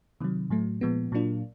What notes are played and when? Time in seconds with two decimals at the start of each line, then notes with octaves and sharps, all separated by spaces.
0.20 C3 D#3 F#3
0.50 A2 F#3 A3
0.81 A#2 F3 G#3 B3
1.12 A#2 F#3 A#3 D4 F4